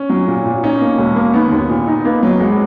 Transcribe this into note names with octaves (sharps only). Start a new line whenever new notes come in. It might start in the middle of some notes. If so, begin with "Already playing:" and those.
Already playing: C#4
F#3
A#2
A#2
C#4 D#4
A#3
E1
A#3
D#3 B3
D#2
A#2
D#4
A#3 B3
F#3
G#1 G#3